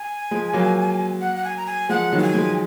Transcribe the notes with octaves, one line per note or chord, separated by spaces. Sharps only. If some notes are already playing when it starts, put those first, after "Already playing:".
Already playing: G#5
F3 G#3
F#3 A#3
F#5
F#5
G#5
A#5
G#5
F3 G#3 F#5
D#3 F#3
F#5
G#5
F3 G#3